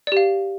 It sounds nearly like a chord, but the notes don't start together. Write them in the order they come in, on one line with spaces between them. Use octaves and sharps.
D5 G4 F5